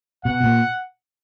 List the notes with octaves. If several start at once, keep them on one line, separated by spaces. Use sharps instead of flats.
B2 F#5
A#2